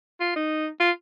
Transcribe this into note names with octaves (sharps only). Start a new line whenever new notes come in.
F4
D#4
F4